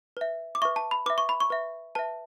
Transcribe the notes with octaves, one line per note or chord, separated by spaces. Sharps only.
B4 E5
D6
B4 E5 C#6
A5
B5
B4 E5 D6
C#6
B5
C#6
B4 E5
B4 E5 A5